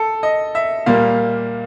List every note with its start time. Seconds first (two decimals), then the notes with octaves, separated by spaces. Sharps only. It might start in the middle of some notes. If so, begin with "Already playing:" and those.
Already playing: A4
0.23 D#5
0.55 E5
0.86 A#2 G3 A#3 F5